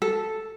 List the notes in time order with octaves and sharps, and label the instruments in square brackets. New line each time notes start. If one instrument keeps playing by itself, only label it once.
[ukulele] A4